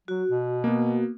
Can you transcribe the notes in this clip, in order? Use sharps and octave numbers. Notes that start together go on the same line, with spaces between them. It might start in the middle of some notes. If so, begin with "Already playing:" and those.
F#3 F#4
B2
A#3 B3